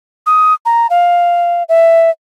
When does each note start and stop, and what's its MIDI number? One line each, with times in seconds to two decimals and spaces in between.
0.26 0.54 87
0.66 0.87 82
0.90 1.63 77
1.69 2.10 76